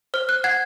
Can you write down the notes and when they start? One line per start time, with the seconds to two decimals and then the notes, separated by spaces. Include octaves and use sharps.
0.14 C5 F6
0.29 F#6
0.44 F#5 G#6